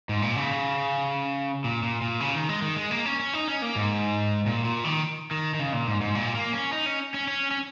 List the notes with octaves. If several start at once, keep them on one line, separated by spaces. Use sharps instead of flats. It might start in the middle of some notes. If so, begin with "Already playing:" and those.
G#2
A#2
C#3
A#2
A#2
A#2
C#3
D#3
G#3
D#3
G#3
A#3
C#4
C#4
D#4
C#4
A#3
G#2
A#2
A#2
D#3
D#3
D#3
C#3
A#2
G#2
G#2
A#2
A#3
C#4
D#4
C#4
C#4
C#4
C#4